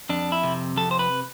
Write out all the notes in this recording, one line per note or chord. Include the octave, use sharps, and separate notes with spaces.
F2 D4
E4
C3
F2 A4
C5
B4